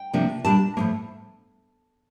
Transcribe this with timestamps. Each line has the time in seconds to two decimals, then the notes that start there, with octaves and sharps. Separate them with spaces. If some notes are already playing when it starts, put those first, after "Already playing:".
Already playing: G5
0.13 C3 F3 A#3 D4
0.45 A#2 G3 D4 A5
0.77 A2 F3 A#3